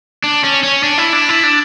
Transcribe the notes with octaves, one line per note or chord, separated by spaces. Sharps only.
D4
C#4
C#4
D4
E4
D4
E4
D4